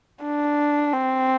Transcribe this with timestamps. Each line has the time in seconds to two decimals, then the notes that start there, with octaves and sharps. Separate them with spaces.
0.23 D4
0.93 C4